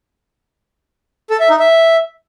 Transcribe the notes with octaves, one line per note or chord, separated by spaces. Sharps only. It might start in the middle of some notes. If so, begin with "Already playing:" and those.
A4
E5
D#4
E5